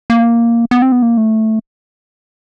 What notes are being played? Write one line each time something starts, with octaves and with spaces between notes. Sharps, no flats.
A#3
B3
C4
B3
A#3
A3